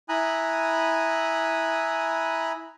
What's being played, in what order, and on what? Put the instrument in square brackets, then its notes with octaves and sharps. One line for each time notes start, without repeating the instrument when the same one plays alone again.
[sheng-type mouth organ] E4 G#5 A#5 B5 D#6 F#6